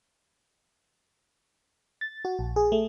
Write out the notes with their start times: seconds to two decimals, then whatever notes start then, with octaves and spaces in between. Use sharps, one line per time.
2.01 A6
2.25 F#4
2.39 A#1
2.56 G#4
2.72 A3